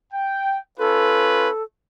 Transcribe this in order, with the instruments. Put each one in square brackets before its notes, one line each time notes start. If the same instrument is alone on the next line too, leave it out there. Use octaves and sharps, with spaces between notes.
[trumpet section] G5
[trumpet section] C#4 F4 B4 [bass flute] A4